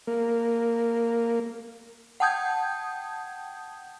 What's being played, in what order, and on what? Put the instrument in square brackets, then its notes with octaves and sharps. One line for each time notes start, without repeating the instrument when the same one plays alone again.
[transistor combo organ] A#3
[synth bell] F#5 G5 A5 D#6 G6 G#6